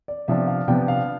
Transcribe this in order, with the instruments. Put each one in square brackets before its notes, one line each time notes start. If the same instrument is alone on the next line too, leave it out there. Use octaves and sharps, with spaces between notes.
[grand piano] D5
C3 F3 B3 D4 E5
F5
C3 F3 B3 D4 G5
F5